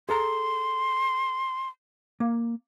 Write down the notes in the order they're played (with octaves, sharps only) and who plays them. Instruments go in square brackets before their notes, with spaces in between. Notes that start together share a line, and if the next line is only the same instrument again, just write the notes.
[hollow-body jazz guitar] G#4 A4 A#5 [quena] C6
[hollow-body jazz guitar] A#3